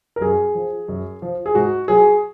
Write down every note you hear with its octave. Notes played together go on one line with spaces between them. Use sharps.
A#4
F#2 G#4
F3
F#2
F3
G#4
G#2 F#4
F#3 G#4